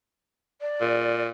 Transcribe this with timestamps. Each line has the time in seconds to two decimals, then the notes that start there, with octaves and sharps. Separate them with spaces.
0.61 D5
0.81 A#2